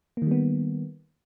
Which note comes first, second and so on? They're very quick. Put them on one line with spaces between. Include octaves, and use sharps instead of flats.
A#3 D#3 G3 B3